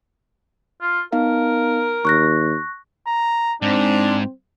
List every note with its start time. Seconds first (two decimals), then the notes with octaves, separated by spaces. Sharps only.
0.81 F4
1.13 B3 D#4 A#4 F5
2.05 D#2 C#6 F#6 A#6
3.07 A#5
3.62 G#2 C4 D4